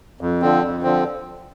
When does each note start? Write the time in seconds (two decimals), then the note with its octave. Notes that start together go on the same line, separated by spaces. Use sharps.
0.21 F2
0.42 D3 F3 C4
0.62 F2
0.83 D3 F3 C4